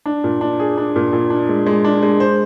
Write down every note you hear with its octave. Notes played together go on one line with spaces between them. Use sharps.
D4
A#2
D4
G#4
D4
A#2
A#2
D4
G#3
G#3
D4
G#3
C5